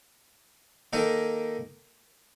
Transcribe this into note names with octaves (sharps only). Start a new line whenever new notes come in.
D#3 A#3 D#4 A4 D#5